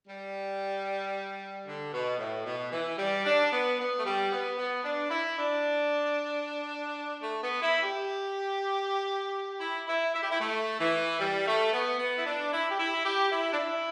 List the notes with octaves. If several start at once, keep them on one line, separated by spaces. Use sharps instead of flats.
G3
D3
B2
A2
B2
E3
G3
D4
B3
B3
A3
G3
B3
B3
D4
E4
D4
A3
B3
E4
G4
E4
E4
E4
G4
E4
A3
E3
G3
A3
B3
B3
E4
D4
E4
G4
E4
G4
E4
D4
E4